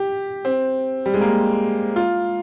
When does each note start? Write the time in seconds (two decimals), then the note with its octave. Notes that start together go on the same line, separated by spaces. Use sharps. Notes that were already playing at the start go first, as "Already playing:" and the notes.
Already playing: G4
0.45 C4
1.06 G3
1.14 G#3
1.21 A#3
1.96 F4